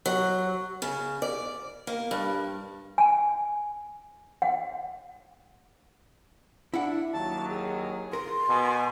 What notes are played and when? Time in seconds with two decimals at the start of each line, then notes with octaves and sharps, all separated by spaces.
0.06 F#3
0.82 C#3
1.22 D5
1.87 A#3
2.11 G2
2.98 G#5
4.42 F#5
6.74 D4 E4 F#5
7.13 D#2 F#3 A5
7.49 G#4
8.13 A#4 C6
8.49 B2 G#5